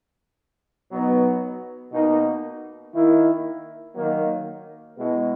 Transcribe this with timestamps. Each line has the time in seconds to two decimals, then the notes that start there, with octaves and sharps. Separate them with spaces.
0.89 B2 F#3 B3 D#4
1.91 B2 A#3 D#4
2.92 D#3 A#3 E4
3.94 D#3 F#3 A#3
4.95 B2 G#3 B3 E4